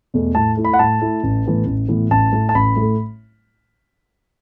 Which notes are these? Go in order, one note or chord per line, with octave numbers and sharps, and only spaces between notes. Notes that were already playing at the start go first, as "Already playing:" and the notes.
E2 B2 A3
A2 A5
A3 E4
B5
F#5
A2 A5
A3 E4
A1
A2 E3 B3
A1
A2 E3 B3
A1 A5
A2 A3
A5
A1 B5
A2 A3